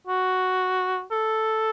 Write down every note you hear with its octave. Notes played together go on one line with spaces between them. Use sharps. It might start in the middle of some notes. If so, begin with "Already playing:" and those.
F#4
A4